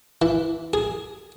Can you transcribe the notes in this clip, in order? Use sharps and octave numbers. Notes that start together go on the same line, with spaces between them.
E3
G#4